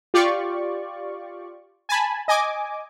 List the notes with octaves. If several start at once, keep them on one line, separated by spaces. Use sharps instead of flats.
F4 G4 D5 C#6
G#5 A5 B5
D#5 G#5 D6